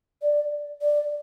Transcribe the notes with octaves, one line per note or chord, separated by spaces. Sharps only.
D5
D5